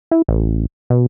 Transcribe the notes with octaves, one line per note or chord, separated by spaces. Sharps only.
E4
A1
B2